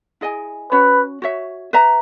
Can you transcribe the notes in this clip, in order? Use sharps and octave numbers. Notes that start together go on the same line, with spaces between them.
E4 G#4 D#5 G#5
C#4 F#4 B4 C#5
F#4 C#5 E5
B4 E5 A#5